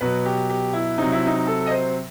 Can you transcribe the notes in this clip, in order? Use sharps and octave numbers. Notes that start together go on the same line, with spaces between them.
B2 F#3 B4
G4
G4
E4
C3 F#3 D#4
E4
D#4
A4
D#5
C5